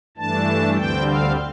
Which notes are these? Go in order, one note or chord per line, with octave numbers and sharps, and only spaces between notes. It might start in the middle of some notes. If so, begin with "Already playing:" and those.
G2 E3 A3 D4 A5
D2 D3 G3 C4 G5
F5